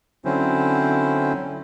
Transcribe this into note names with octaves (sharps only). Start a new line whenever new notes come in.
D3 F#3 C4 C#4 E4 C5